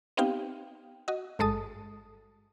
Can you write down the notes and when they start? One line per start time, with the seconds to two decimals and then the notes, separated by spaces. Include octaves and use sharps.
0.17 B3 C4 D#4 G4 F5 G5
1.08 F#4 D#5
1.39 G#1 G2 G#3 A4 A5 D#6